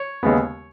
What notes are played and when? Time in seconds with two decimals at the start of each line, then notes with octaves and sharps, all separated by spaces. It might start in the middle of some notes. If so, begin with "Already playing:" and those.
Already playing: C#5
0.23 D#2 C#3 G#3 B3